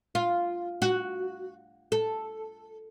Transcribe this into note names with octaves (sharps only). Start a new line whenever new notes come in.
F4
F#4
A4